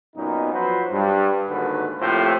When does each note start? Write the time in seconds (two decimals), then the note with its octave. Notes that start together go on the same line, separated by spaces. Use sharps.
0.16 F#2 A#2 B3 D#4
0.52 F3 F#3 F#4 B4 C5
0.91 G2
1.49 D#2 G#2 D3 D#3 F#4 B4
2.00 F2 A2 A#3 F4 G4 C5